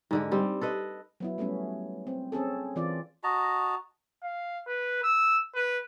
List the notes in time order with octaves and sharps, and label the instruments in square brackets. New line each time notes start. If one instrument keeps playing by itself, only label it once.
[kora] G#2 D3 G#3
G3 C4
A4 B4 D#5
[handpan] F#3 B3 E4
G3 A3 B3 C#4
C4
C4 C#4 G#4 A4
E3 C4 F4 D5
[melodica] F#4 D#5 A5 A#5
[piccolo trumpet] F5
B4
E6
B4